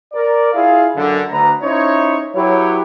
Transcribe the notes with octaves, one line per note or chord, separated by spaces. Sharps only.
A#4 D5
E4 F4 G#4 E5 F5
F#2 D3
D2 B4 A#5
C#4 D#4 E4 C5 C#5
F#3 E4 G4 B4 C#5